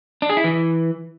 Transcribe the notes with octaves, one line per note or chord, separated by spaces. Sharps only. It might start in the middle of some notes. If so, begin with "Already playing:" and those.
D4
G#4
E4
E3